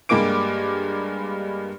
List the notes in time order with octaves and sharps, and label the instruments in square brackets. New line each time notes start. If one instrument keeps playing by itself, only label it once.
[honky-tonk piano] G2 G3 G#3 A#3 D6 D7